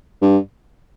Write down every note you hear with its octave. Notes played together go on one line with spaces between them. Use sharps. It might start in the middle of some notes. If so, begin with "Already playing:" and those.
G2